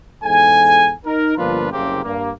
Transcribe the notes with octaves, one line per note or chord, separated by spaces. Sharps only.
E2 G#2 A4 G#5
D#4 A#4
G1 F3 A#3 D4 F4 B4
F#1 C2 C#3 A#3 C4 G4
G2 A#3